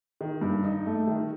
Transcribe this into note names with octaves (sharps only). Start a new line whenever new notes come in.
D#3
G2
D#4
A3
D#3